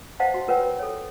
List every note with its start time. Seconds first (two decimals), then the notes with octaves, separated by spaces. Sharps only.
0.20 C5 D#5 F5 F#5 A5
0.34 F#4
0.48 F4 A#4 B4 C#5 F#5 G5
0.79 A4 C#5